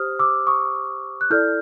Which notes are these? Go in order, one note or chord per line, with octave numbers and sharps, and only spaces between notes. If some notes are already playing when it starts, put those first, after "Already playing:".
Already playing: G4 C5 D#6 F6
D6 E6
C#6 D#6
F#6
E4 A4 D5 F6 G6